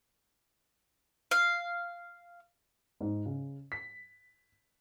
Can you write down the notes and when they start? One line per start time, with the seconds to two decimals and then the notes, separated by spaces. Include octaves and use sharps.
1.31 F5
3.01 G#2
3.26 C#3
3.72 B6